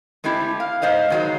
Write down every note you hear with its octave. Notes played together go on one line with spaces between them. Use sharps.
G#3 A3 C4 E4 G4
F5
G#2 C5 D#5 F5
D#3 F#3 G#3